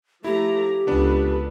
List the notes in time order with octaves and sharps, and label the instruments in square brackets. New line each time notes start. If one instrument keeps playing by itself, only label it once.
[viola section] F3 A3 A#5 [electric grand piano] E4 [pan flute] G4
[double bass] C#2 [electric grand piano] B3 D4 [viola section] A4 B4